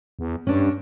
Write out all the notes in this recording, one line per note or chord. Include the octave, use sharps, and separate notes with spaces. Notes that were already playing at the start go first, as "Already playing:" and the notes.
E2
G2 C#4 D4